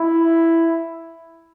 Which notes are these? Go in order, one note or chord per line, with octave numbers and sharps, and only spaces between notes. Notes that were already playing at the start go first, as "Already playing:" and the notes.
Already playing: E4